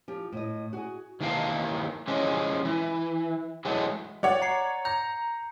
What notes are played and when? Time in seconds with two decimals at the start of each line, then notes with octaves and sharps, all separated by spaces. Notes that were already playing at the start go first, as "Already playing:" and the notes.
0.08 F3 G4
0.33 A2 D#5
0.73 F#4 G#4
1.21 D#3 E3 A#3 F5 A5
2.08 E3 F3 G#3 C#4
2.65 E3
3.65 E3 F#3 G#3 A3
4.23 C#5 D5 F#5
4.42 A#5 C7 C#7
4.85 A#5 G6